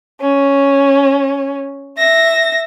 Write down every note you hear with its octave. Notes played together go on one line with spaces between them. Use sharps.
C#4
E5 A#6